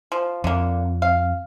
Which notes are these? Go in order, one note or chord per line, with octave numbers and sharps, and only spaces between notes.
F3
F2 D3 A#3
F5